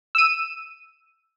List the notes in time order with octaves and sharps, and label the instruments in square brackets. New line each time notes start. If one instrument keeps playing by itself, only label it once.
[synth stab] E6 D#7